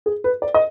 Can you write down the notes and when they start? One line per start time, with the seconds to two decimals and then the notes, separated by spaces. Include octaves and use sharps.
0.06 G#4
0.24 B4
0.42 D5
0.54 D#5